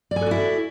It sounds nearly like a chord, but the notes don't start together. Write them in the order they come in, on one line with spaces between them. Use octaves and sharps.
D5 G#5 A4 F#4 E4